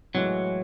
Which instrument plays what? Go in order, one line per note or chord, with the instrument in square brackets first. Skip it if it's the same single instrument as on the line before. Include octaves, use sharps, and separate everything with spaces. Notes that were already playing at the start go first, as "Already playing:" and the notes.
[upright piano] A2 E3 G#3 [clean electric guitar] F#3